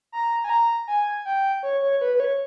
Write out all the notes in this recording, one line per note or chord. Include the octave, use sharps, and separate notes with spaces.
A#5
G#5
A#5
G#5
G5
C#5
C#5
B4
B4
C#5